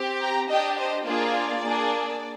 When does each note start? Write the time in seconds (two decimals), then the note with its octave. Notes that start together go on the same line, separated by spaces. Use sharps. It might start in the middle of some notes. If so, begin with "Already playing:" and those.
Already playing: C4 G4
0.20 G5 A#5
0.48 D4 G4 D#5 G5
0.77 C5 D#5
1.06 A#3 D4 F4 G#4 D5
1.64 A#3 D4 G#4